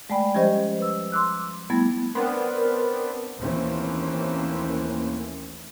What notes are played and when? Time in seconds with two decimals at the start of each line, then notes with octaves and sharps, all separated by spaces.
0.10 G#3 A3 D5 G5 B5
0.35 F3 G3 C#4 G4 C5 D#5
0.79 B4 E6
1.12 C6 D6 E6 F#6
1.70 G3 A3 B3 E4 G#6 A6
2.15 B3 C4 D4 A#4
3.39 D#2 E3 A3 A#3 C4 C#4